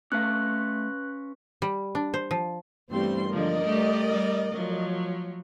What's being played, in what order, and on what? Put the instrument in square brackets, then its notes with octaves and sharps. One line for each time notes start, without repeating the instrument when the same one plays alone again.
[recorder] A3 [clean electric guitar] C#4 B4 F5 [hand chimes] F#6
[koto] G3
D4
C5
F3
[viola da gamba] E2 G2 A3 [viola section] G3 C4 C6
[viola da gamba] D3 F3 G#3 [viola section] A#4 D5 D#5
[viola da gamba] G3 A3 G4
G3
F3 F#3